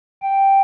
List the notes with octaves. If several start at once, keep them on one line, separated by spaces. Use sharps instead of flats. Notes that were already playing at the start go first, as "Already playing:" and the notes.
G5